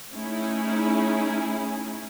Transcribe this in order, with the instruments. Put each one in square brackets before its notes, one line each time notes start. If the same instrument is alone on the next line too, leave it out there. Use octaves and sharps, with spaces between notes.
[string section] A3 C#4 D#4 E4 G#4